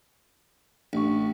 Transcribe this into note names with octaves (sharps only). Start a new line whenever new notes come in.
A1 D4 C#6